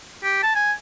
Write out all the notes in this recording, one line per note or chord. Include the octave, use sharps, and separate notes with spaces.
G4
A5
G#5